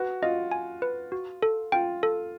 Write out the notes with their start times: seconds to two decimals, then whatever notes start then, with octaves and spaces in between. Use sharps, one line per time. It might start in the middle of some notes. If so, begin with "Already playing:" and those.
Already playing: F#4 B4
0.22 F4 D#5
0.51 G#5
0.82 B4
1.12 F#4
1.42 A4
1.72 F4 G5
2.03 A4